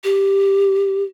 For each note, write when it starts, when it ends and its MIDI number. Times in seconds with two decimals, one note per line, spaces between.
0.04 1.03 67